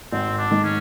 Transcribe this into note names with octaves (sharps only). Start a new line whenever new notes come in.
G#1 C4
D4
G#2 D#3
C#4